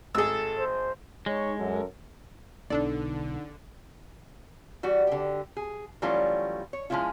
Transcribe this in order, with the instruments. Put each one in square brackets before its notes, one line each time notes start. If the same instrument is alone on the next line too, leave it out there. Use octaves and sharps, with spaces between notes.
[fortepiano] G#1 G#4 [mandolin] A4 E6
[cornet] C5
[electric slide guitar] G#3 [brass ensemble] D#4 C#5
[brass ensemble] F#2 A4 A#4
[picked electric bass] B1 B3 [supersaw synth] D3 [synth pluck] D4 A4 D5 [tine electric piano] D#4
[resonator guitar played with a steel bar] E3 G3 F#4
D3 G4
G#4
E3 F#3 G3 A3 C#4 F4
C#5
F3 F#3 G#3 C#4 E4 F4